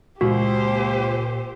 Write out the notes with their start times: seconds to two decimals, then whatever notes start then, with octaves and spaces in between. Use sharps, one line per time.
0.21 C#2 A#2 F#4 G4 C5